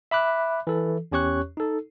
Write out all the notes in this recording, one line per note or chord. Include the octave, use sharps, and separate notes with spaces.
E5 B5 D6 F#6
E3 A4
E2 C#4 G4 C#5 C#6 F#6
D#4 A4